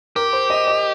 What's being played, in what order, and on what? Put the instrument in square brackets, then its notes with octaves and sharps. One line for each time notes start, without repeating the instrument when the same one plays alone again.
[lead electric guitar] G4 [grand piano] A#4
[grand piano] C5
D#5
D#5